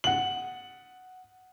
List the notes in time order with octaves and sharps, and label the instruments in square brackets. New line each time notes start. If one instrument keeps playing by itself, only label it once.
[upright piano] F#5 F#7